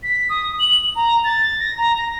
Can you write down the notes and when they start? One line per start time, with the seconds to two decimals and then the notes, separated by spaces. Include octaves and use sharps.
0.03 B6
0.29 D#6
0.59 F#7
0.95 A#5
1.24 A6
1.59 A#6
1.78 A#5
1.98 A#6